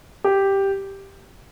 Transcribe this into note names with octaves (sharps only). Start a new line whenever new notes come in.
G4